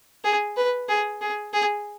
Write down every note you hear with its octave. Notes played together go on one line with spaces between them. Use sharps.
G#4
B4
G#4
G#4
G#4